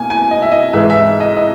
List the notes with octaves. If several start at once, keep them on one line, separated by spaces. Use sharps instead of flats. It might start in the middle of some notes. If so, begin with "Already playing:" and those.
Already playing: B2 A#3 G#5
G#5
D#5
E5
D#5
G#2 E3 G#3 E5
E5
D#5
D#5